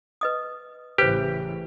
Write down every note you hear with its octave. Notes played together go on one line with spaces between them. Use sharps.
B4 D#5 D#6
A1 C#3 E3 G4 B4 C5